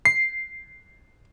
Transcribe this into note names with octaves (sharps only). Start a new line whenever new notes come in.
C7